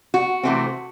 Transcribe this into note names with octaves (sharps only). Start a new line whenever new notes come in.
F#4
C3 E3 A3 C4